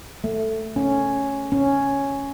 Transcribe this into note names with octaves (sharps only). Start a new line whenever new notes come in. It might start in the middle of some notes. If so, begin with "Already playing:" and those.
A3
C#4
C#4